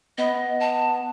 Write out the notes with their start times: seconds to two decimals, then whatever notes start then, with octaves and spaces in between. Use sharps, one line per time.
0.18 B3 D#5
0.60 A5